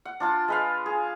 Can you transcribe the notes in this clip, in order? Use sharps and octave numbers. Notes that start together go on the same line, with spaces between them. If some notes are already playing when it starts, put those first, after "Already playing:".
F#5
D4 F4 A5
G#3 B4 F5
G#4